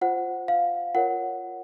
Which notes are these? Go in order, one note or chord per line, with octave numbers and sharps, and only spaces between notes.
F4 C5 F#5
F5
F4 A#4 C#5 F#5